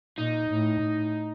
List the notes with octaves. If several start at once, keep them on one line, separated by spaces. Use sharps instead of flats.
A#2 D#4
A2
A2